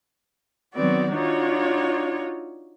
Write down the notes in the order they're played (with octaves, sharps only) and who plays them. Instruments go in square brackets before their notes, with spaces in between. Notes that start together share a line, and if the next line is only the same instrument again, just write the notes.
[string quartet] D#3 F#3 B3 C4 F#4 D5
D4 D#4 F4 F#4 C#5